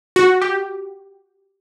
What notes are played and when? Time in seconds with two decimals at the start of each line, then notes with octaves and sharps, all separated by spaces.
0.16 F#4
0.42 G4